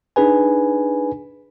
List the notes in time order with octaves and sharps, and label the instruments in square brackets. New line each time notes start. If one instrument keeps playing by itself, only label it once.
[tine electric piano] D4 D#4 G#4 B4 G#5